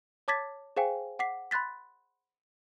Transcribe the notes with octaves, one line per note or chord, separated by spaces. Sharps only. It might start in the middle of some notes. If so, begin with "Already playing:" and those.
C#5 A5 D6 G#6 A6 B6
G#4 C5 F5 G5 G#5
F#5 D6 B6 C7
B5 C6 F#6 A6 B6